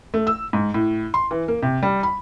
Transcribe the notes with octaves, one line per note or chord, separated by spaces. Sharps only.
A3
E6
G#2
A2
C6
E3
A#3
C3
G3
B5